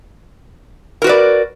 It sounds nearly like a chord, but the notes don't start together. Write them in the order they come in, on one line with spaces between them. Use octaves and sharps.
A#4 F#4 B4 D5